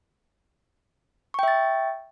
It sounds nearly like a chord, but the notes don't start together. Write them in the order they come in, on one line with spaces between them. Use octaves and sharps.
C#6 G5 E5 A6